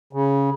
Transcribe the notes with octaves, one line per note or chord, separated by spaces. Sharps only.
C#3